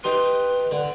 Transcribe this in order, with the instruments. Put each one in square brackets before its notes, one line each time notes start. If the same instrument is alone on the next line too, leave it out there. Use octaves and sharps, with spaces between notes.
[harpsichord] D#4 G4 C6 [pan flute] B4
[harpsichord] D3